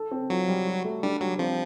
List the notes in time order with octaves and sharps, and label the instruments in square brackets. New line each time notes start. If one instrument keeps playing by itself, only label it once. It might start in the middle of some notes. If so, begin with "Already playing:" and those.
Already playing: [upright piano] A4
C4
[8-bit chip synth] F#3 [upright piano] F4
[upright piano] G3
F#4
A3
[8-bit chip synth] G3 [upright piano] D4
[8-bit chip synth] F#3 [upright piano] G3
[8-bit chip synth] F3 [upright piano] C4